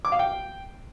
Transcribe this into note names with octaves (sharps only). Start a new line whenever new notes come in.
D6
F5
G5